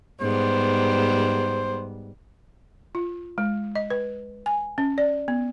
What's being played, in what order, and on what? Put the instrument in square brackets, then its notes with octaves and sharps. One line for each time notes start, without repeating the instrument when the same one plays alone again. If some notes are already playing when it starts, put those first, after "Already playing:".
[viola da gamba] G#2 G3 B3 [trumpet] C5
[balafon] F4
G#3
D#5
B4
G#5
C#4
D5
B3